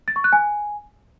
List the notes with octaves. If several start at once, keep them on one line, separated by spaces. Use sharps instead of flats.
A6
C#6
F#6
G#5